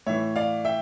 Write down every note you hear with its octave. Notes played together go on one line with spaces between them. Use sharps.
A2 E3 C#5 E5
D5 F5
E5 G5